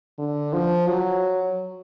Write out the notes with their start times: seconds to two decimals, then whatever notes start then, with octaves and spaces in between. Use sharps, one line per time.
0.19 D3
0.53 F3
0.88 F#3